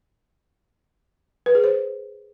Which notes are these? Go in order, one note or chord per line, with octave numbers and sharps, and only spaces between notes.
B4
G#4
C5